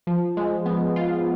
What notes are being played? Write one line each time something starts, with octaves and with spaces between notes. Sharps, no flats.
F3
G#3
B3
F4